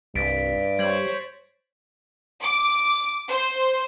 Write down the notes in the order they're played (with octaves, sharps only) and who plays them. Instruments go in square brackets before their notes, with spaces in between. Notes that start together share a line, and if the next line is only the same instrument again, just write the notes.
[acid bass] C2 [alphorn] G2 [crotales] A6 B6 D7
[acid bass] G3 [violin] C5 C#5 [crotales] G#6 F#7
[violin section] D6
C5